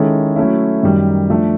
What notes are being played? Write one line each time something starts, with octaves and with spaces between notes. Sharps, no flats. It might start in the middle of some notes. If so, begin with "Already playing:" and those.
Already playing: D#3 G#3 C#4 E4 A4
F#3 A3 C#4 E4
F#2 D#3 G3
F3 A3 D4